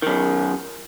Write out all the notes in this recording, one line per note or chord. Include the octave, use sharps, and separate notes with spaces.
F#2 D#3